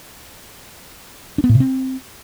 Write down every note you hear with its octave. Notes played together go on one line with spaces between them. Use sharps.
D4
B3
A2
C3
C4